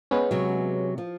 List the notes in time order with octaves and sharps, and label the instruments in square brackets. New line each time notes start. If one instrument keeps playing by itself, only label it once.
[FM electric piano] G#3 B3 C#4
[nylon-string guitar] C3 F#3
F3